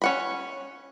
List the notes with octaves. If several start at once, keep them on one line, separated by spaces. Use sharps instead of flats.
C#4 F#5 B5